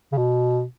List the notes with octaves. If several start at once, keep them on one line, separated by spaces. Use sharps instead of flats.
C#3
B2